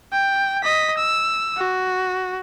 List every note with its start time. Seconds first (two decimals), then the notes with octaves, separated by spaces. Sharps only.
0.12 G5
0.63 D#5 B6
0.97 E6
1.58 F#4